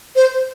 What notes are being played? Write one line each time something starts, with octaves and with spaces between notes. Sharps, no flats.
C5